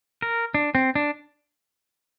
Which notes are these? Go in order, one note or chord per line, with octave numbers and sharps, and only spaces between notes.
A#4
D4
C4
D4